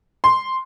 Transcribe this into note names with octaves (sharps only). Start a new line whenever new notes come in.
C6